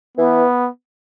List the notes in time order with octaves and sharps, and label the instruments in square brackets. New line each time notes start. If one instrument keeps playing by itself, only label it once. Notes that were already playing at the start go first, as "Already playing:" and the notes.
[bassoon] E3 [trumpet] B3